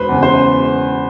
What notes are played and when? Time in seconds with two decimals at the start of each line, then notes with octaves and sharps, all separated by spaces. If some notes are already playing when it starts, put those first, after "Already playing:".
Already playing: E1 B4 C5
0.09 E2 C#3
0.23 C5